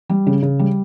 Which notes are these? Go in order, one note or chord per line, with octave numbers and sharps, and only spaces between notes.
G3
C#3
C#3
G3